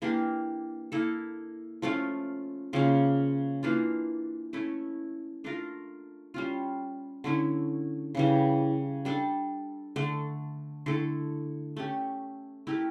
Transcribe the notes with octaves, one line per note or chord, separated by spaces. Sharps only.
E3 A#3 D4 G4
A#3 E4 A4
F3 A3 C#4 F4
C#3 F3 A#3 C#4
E3 A#3 D4 F4
A3 C#4 E4
A3 D4 F4 A#4
G3 C#4 F4
D3 A3 C#4 E4
C#3 E3 G3
G3 D4 A4
D3 A3 D4
D3 A3 E4 A4
A3 C#4 G4
A3 E4 G4 A#4